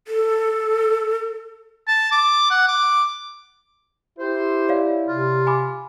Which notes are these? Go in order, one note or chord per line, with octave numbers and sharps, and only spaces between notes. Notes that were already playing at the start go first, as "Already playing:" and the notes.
A4
A5
D6
F#5
D6
E4 G4 C5
C#5 D5 F5
C3 F4
G#5 B5 D6